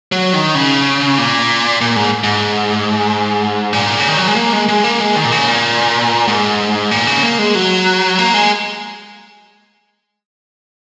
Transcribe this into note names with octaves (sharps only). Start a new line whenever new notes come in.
F#3
D#3
C#3
A#2
A#2
G#2
G#2
A#2
C#3
D#3
F#3
G#3
A#3
G#3
G#3
A#3
G#3
D#3
A#2
C#3
A#2
G#2
A#2
C#3
A#3
G#3
F#3
A#3
G#3